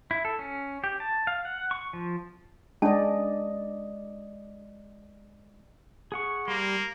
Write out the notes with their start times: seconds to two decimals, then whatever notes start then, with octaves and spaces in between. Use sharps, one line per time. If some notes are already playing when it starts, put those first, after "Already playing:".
0.11 E4
0.25 A4
0.39 C#4
0.84 G4
1.00 A5
1.27 F5
1.45 F#5
1.71 C#6
1.93 F3
2.82 G#3 C#4 D4 D5 D#5 A5
6.12 G#4 F#5 C#6
6.48 G3 A#3 C6